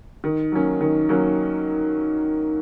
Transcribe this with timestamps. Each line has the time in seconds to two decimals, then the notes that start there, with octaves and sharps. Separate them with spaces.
0.24 D#3
0.52 F#3 A#3 C#4
0.81 D#3
1.09 F#3 A#3 C#4